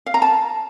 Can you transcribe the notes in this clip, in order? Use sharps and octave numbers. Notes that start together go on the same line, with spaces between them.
F5
A#5
A5